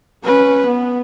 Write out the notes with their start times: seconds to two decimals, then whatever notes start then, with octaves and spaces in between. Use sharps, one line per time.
0.24 C#4 B4
0.66 B3